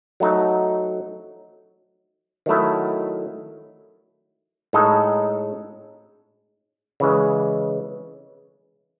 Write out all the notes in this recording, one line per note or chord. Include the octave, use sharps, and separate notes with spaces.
F#3 A3 D#4
D#3 F#3 A3 E4
A2 G#3 D#4 A4 D#5
C#3 E3 G#3